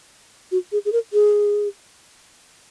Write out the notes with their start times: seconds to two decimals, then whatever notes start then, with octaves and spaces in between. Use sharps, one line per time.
0.52 F#4
0.72 G#4
0.85 G#4
0.93 A#4
1.13 G#4